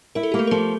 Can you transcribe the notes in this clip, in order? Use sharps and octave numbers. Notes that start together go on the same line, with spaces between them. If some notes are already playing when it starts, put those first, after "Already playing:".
E4 A#4
A4
A#3 G4
A3 A4
A#4
F3 A3 A4